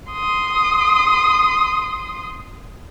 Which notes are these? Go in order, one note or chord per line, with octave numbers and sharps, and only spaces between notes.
C6 D#6